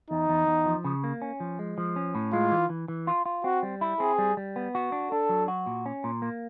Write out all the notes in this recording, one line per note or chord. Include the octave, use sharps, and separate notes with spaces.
E2 D#4
E2
E2
F3
C#3
A#3
C#4
F3
G#3
F3
C#4
A2
G#3 F4
E3
E3
E3
F4
F4
C4 F#4
G3
E4
C4 G#4
G3
G3
B3
F#4
D4
D4 A4
F#3
F#4
A#2
C#4
A#2
A#3